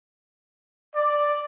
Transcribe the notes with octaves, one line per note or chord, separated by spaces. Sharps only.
D5